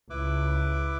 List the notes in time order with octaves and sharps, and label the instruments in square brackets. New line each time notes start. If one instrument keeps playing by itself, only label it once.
[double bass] C#2 [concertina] E4 B4 D6